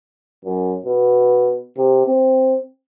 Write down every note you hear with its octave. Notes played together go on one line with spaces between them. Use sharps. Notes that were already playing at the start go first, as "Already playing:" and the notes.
F#2
B2
C3
C4